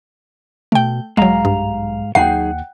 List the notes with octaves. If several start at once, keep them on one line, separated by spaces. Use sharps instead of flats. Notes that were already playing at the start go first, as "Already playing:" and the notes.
B2 A3 G5
B1 G#2 F#3 G#3 F5 A#5
G2
D#2 F#3 D#4 G#4 F#5 G5 C7